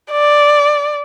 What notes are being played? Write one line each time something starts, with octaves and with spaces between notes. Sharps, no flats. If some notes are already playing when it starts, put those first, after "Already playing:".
D5